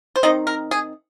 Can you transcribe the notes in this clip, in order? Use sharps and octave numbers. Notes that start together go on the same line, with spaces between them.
C5
D#3 C4 D#4 D#5
A#4
G#4